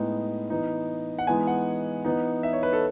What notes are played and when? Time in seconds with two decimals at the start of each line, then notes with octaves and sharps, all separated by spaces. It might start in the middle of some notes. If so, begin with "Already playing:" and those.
Already playing: A2 G#3 B3 D#4
0.50 E3 B3 D#4
1.19 F#5
1.27 E3 G#3 B3 D#4 G#5
1.47 F#5
2.05 E3 B3 D#4
2.43 E5
2.53 C#5
2.63 B4
2.73 A4